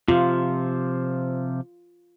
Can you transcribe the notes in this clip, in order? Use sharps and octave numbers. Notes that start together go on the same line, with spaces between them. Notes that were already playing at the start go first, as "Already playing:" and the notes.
C3 F3 F4